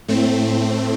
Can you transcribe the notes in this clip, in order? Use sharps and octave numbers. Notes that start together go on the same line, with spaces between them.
A2 A3 C4